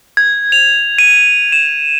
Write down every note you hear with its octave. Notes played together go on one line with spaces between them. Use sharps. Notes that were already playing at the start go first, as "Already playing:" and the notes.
G#6
F7
D#7
E7